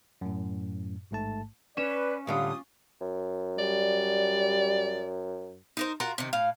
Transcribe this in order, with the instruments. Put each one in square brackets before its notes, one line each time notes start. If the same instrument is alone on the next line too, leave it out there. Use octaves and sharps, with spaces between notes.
[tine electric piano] F#2 A2
A1 G#2 A3 A5
[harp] C#4 C#5 E7 [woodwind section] B4 [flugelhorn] D5
[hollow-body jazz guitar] A2 D3 G3 [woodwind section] A#3 F4 D#6 [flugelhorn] F5
[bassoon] F#2
[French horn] G3 [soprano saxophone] D5
[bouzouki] D#4 A#4 C5
F4 F#4 A#4 A#5
C3 D#3
A2 F5